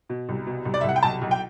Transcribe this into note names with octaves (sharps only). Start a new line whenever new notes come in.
B2
C2
B2
C2
D5
E5
C2 F#5
G5
B1 A5
B1
G5